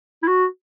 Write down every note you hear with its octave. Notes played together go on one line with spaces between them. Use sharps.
E4
F#4